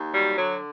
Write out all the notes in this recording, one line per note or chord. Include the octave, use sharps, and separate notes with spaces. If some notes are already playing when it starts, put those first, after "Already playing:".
Already playing: D#2
F#3 G3
D3 F#3